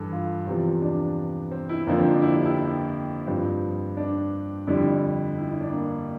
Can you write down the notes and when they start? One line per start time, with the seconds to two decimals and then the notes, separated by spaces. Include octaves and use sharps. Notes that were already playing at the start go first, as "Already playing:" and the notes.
Already playing: G2 E3 A4
0.12 F4
0.47 E2 C3 F3
0.82 D4
1.51 C4
1.69 E4
1.87 F2 D3 F3 A#3
1.99 C4
2.10 D4
2.22 E4
2.34 G4
2.45 E4
2.57 E4
3.27 G2 F3 C4
3.97 D4
4.67 F2 D3 G3 E4
5.37 E4
5.49 E4
5.61 D4
5.72 A#3